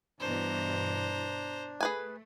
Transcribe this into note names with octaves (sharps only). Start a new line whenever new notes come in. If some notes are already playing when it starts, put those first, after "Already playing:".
G2 B2 E3 D4 C5 A#5
A3 G#4 B4 G#5